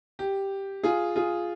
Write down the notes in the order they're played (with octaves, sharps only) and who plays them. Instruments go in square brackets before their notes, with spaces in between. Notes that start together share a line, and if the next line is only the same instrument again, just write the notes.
[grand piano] G4
F4 G#4
F4 G#4